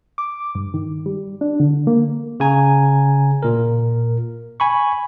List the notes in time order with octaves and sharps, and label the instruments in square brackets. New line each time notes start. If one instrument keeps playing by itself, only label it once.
[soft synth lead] D6
G2
D#3
G3
D4
D3
A#3
[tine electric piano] C#3 G#5 A#5
A#2 A#4
G#5 B5 C#6